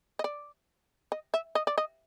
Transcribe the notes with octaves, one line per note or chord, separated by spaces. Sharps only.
D#5
D5
D#5
E5
D#5
D5
D#5